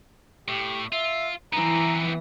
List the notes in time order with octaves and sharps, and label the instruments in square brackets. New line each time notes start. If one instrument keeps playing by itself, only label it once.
[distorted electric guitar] A2 [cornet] G4
[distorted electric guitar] F4 [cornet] E5
[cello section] E3 [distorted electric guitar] B3 C4 [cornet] A#5